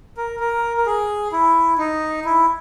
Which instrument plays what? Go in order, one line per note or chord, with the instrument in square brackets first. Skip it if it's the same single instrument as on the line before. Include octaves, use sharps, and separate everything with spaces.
[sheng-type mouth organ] A#4
A#4
A#4
G#4
E4
D#4
E4